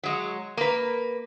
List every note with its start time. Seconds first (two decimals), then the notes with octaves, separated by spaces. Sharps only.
0.03 F#3 G#3
0.57 A#3 B4